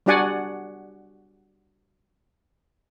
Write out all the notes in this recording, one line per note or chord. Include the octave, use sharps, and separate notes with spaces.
G3 D4 F#4 D5 F#5 G#5